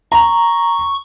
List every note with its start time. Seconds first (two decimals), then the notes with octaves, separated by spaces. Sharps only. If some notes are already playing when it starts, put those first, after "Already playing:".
0.12 A#5 C#6